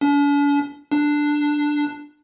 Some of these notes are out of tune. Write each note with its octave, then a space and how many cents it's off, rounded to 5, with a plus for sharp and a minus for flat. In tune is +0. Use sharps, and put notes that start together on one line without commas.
D4 -45
D4 +5